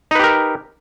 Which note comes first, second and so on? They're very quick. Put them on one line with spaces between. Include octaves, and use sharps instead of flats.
D#4 B4 G4 A#4